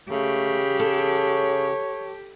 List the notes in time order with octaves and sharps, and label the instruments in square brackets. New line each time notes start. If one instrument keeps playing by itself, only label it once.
[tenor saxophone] C#3 [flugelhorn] A3 [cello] G4
[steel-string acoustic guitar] A4 [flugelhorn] C#5